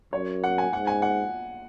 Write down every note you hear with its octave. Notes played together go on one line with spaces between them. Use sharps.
F#2 C#5
F#5
G#5
G#2 F#5
G#5
F#5